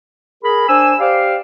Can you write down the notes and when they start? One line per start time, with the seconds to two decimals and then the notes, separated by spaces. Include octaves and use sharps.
0.43 G#4 A#4 B5
0.69 D4 C5 G#5 E6
1.00 G4 C5 D5 F5